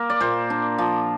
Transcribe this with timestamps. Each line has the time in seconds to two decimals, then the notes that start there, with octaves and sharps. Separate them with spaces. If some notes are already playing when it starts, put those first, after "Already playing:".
Already playing: A#3 A#4
0.10 D5
0.20 A#2 C5
0.50 D4
0.78 F3